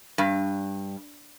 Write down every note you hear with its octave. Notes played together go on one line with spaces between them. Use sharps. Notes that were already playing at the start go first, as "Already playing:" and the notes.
G2